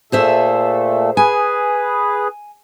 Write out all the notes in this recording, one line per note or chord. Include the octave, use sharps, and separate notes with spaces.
A#2 A3 G#4 A4 C5 E5
G#4 B4 G#5